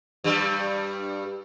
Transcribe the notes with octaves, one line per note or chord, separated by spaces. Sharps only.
G2 G3